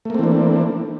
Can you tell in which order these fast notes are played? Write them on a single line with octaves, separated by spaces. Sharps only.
A3 A#3 C4 E3 D4